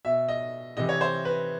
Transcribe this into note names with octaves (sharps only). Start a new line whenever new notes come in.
B2 E5
D#5
C3 E3 D#5
C#5
C5
B4